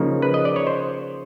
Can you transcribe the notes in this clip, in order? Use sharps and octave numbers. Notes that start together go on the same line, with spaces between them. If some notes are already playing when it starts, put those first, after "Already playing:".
Already playing: C#3 F3 A#3 D#4
B4
D#5
D5
C#5
C5